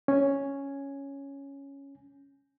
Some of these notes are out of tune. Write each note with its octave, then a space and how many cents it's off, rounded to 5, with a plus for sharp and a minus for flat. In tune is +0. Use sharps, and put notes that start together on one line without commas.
C#4 +0 G#5 +0